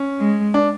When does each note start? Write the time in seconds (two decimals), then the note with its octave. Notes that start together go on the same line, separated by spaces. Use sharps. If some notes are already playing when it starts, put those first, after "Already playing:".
Already playing: C#4
0.20 G#3
0.54 D4